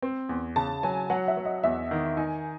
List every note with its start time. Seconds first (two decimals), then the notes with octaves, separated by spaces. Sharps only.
0.02 C4
0.29 E2
0.56 C#3 A5
0.83 F#3 G#5
1.10 F#3 F#5
1.28 E5
1.37 F#3
1.45 D#5
1.63 E2 E5
1.91 D#3
2.17 D#4 G#5